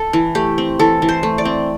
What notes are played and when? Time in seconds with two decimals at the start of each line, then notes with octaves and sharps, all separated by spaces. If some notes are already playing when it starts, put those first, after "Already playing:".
Already playing: A4
0.13 E3
0.35 A3 G4
0.58 C4
0.79 E3 A4
1.02 E3
1.09 C5
1.23 A3
1.38 D5
1.45 C4